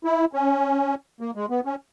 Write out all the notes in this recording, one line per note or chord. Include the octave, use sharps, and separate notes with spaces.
E4
C#4
A#3
G#3
B3
C#4